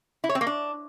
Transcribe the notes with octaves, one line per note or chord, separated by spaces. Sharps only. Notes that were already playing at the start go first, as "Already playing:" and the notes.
E4
C#5
C4
A#3
D4